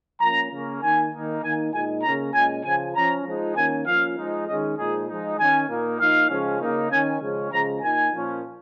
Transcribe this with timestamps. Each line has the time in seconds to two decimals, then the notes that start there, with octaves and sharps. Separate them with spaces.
0.20 F3 A#3 C#4 A#5
0.52 C#3 A#3 C#4
0.82 D#3 A#3 D#4 G#5
1.13 D#3 A#3 D#4
1.43 D#3 A#3 D#4 G#5
1.73 A#2 G#3 D#4 G#5
2.03 C#3 A#3 C#4 A#5
2.34 A#2 G#3 C#4 G#5
2.65 C#3 F3 C#4 G#5
2.95 F3 C#4 A#5
3.25 F3 G#3 D#4
3.56 D#3 A#3 C#4 G#5
3.86 F3 A#3 C#4 F5
4.16 F3 G#3 D#4
4.47 D#3 G#3 C#4 D#5
4.77 A#2 F3 G#3 D#4 G#4
5.08 F3 G#3 D#4
5.39 D#3 C#4 G#5
5.69 A#2 A#3 D#4
5.99 F3 A#3 D#4 F5
6.30 C#3 F3 G#3 C#4
6.60 C#3 A#3 D#4
6.90 D#3 C#4 G#5
7.22 C#3 F3 G#3 C#4
7.51 C#3 F3 G#3 A#5
7.82 A#2 A#3 D#4 G#5
8.12 A#2 F3 C#4